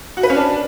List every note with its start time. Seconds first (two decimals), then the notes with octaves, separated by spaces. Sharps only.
0.17 F#4
0.23 B4
0.30 C#4
0.36 D4